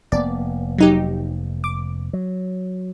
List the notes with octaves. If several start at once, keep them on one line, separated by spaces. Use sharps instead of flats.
F1 A#3 B3 D5
F#3 D#4 G4
D6
F#3